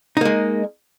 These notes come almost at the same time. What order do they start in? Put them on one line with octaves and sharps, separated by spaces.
D#4 A#3 G#3